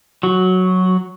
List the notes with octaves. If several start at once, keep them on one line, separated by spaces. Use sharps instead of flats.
F#3 F#4